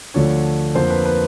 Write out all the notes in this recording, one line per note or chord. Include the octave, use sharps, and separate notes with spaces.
D2 D3 F3 A3 D4 C#5
F2 D3 F3 A#3 C5
B4
B4